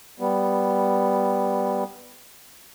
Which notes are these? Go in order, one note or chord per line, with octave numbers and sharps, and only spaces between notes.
G3 B3